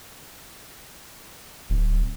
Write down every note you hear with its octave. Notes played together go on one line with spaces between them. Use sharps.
D1